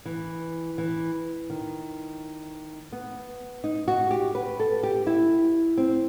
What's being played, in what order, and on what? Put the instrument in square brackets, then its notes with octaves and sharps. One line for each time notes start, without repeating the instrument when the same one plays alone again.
[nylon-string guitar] E3
E3
D#3
B3
D#4
F#4
G4
B4
A4
G4
E4
C4